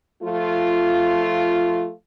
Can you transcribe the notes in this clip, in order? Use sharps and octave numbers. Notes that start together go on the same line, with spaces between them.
F3 A3 F4